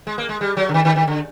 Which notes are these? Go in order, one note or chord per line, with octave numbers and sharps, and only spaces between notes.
G#3
A#3
G#3
G3
F#3
D3
D#3
D#3
D#3
D3